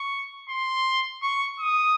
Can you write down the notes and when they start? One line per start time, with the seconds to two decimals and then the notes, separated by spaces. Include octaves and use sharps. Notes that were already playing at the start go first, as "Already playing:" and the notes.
Already playing: C#6
0.49 C6
1.22 C#6
1.60 D#6